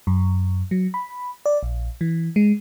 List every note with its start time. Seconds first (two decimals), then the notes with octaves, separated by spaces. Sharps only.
0.07 F#2
0.71 F#3
0.94 B5
1.46 D5
1.63 A#1
2.01 E3
2.36 G#3